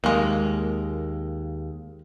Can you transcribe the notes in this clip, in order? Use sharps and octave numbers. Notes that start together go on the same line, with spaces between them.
D#2 G#3 A#3